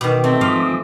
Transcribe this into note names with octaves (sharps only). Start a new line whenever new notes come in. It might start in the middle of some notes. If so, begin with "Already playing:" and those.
B2 D#3 D6
A3 C4 E5
G#2 F3 F5 C6 D6 D#6 B6